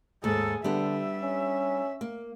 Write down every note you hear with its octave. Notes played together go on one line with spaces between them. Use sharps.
D#2 G#2 G#4 A4
D3 G3 B3 D4 E5
C#4
A#3